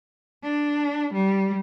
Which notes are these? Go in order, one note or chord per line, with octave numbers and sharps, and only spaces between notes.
D4
G3